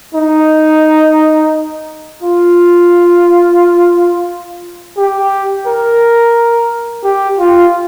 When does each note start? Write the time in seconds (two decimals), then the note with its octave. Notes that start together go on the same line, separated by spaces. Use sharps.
0.14 D#4
2.22 F4
4.97 G4
5.67 A#4
7.04 G4
7.39 F4